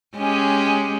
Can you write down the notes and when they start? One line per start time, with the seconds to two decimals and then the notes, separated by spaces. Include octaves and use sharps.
0.17 G#3 C#4 G4